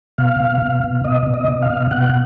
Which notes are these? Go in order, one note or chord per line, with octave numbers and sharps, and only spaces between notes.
B2 F5
B2
B2
B2
B2 D#5
B2
D#5
B2
F5
B2
B2 F#5